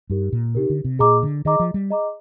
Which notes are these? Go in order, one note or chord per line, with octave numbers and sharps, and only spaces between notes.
G2 D#4 G4 A#4
A#2
C3 D#4 G4 A#4
D3
C3
A#2 G#4 D#5 A#5 D6
D3
D#3 G#4 D#5 A#5 D6
F3
G3
G#4 D#5 A#5 D6